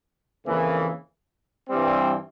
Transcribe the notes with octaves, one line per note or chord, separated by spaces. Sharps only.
F2 C#3 E3 A#3
G2 E3 G3 C4